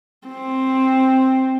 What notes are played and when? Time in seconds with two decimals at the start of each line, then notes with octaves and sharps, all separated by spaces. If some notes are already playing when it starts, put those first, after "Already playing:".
0.28 C4